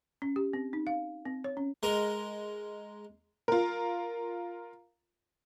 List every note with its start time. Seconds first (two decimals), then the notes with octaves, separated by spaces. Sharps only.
0.22 C#4
0.36 G4
0.53 C4
0.73 D#4
0.87 F5
1.25 C4
1.44 C#5
1.57 C#4
1.83 G#3 A#4
3.48 F4 A#4